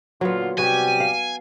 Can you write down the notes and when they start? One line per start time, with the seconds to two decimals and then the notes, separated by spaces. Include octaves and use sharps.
0.21 A#2 D3 F#3 B3 F4
0.58 C3 G3 B3 F#4 G4 G#5
1.00 F5